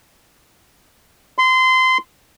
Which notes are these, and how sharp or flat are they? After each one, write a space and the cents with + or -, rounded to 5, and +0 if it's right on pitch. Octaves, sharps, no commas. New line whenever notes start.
C6 -25